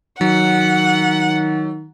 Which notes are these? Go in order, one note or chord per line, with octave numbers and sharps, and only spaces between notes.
D#3 F#3 F#5